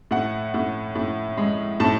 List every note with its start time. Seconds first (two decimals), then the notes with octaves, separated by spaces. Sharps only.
0.11 A2 F#5
0.54 A2
0.95 A2
1.37 G#3
1.80 A2 A5